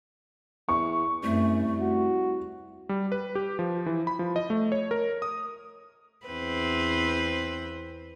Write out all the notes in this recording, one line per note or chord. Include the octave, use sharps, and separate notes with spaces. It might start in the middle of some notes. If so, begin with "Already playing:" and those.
E2 C#6
C2 F#2 A3
F#4
G3
B4
G4
F3
E3
B5
F3
D#5
A3
C#5
A#4
D#6
E2 C4 B4